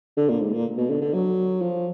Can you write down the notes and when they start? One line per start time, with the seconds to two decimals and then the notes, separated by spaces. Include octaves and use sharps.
0.17 D3
0.29 A#2
0.41 G#2
0.53 A#2
0.77 B2
0.90 D3
1.01 D3
1.13 F#3
1.61 F3